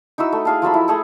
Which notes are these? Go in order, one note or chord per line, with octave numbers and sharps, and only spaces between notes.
D#4 E4 F#4 E6
A3
G#4 F5 A5
F3 F#3 A5 B5
E4
A3 G#4 A4